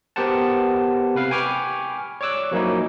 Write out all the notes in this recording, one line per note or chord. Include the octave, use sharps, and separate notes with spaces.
B3 G4 A#4 C5 F#5 A5
C3 B4 F5
G5 G#5 B5 C#6 D6 F6
C#5 D5 D6 E6 F#6
F3 F#3 A#3 C#4 D#4 E4